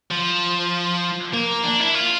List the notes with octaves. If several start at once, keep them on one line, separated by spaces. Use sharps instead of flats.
F3
A#3
D4
E4
F4